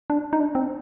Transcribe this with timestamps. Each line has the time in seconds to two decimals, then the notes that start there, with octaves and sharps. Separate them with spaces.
0.10 D4
0.33 D#4
0.40 D4
0.55 C4